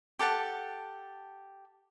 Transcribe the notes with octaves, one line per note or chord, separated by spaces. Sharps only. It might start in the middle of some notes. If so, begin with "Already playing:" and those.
G4 A4 F#5 A5